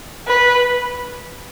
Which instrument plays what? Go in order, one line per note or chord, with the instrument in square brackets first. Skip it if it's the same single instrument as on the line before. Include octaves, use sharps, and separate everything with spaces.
[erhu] B4